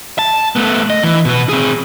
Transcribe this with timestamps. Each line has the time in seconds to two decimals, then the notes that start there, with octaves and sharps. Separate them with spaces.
0.19 A5
0.56 A3 B3
0.90 D#5
1.03 E3
1.25 B2 B3
1.49 C4 G#4